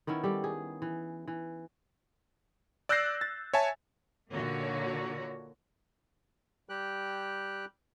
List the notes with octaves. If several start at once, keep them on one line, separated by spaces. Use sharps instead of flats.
D#3 B3 C#4 E4
G3 G4 A4
G#4
E3
E3
D5 E6 F#6 G6 A#6 C7
A6
C#5 E5 G#5 A5
A#2 D3 D#3 A#3 F#4 C#5
G3 G4 G5 F#6